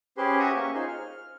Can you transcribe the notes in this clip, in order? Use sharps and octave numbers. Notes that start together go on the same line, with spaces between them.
C#4 G4 G#4 B4 C5
F#4 G4 E5 A#5 C#6 D#6
A#3 C#4 C#6
D#4 F4 G#4 C5
F6